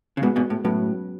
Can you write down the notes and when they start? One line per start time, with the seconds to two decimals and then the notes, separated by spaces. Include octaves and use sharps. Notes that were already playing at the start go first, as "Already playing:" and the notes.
0.17 C#3
0.22 G#2 B2 G#3 B3 F#4 B4
0.36 G#2 B2
0.50 A2
0.64 A2 F#3 C#4 F#4 B4